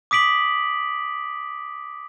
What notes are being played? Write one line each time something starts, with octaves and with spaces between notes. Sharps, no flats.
D6 D#6 B6 D7 F#7